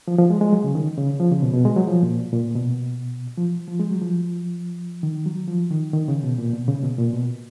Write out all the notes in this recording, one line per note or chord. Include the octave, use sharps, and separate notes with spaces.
F3
F3
G#3
G#3
F#3
C#3
D#3
C#3
F3
C#3
B2
B2
G#3
F#3
F3
A#2
A#2
B2
F3
F3
G#3
F#3
F3
D#3
F#3
F3
D#3
D#3
C#3
B2
A#2
B2
C#3
B2
A#2
B2